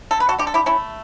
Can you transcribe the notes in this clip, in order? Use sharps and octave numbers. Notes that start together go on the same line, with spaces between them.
D3 A4
B4
F#4 A4
D3 G4
A4
E4 G4
A3 C#4 E4